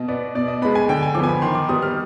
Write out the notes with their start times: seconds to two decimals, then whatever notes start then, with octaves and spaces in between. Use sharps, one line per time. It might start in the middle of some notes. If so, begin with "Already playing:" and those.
Already playing: B2 D#5
0.08 B3 D5
0.35 B2 D5
0.48 D#5
0.62 G#3 B3 B5
0.75 G#5
0.89 D3 G5
1.03 G#5
1.15 F3 D6
1.20 B3 G#5
1.29 B5
1.42 D#3 C6
1.55 D6
1.69 G3 B3 D#6
1.82 F6